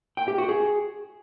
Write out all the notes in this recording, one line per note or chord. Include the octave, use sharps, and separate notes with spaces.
G5
G4
F#4
G#4